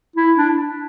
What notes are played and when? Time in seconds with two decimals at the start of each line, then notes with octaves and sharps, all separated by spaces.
0.16 E4
0.38 D4